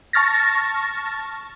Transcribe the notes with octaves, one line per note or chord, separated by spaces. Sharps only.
A5 C#6 F6 A6 A#6